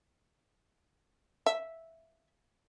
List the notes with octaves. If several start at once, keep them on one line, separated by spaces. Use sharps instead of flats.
E5